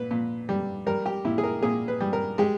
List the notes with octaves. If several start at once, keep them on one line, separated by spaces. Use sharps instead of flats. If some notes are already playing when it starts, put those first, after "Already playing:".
Already playing: A#2 B4
A#2
G3
G3 A#4
G4
A#2 E4
G#4
A#4
A#2 G#4
B4
G3
A#4
G#3 G4